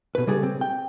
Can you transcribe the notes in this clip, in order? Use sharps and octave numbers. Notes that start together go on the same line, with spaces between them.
B2 B4
C#3 G3 G#4 A4
C4
G5